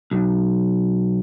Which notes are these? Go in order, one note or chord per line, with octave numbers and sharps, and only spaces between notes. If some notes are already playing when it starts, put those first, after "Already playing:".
B1